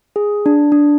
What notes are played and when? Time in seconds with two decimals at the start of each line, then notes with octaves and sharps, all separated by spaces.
0.16 G#4
0.46 D4
0.72 D4